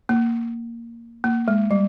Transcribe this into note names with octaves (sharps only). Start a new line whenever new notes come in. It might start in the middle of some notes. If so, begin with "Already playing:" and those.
A#3
A#3
G#3
G3